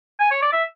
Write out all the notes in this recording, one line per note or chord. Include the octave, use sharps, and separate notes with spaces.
G#5
C#5
D5
E5